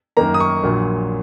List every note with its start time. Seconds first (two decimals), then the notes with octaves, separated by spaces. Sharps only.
0.17 F#2 D#3 A#3 A#5
0.34 D#6
0.40 C#6
0.63 A#1 A#2 F#3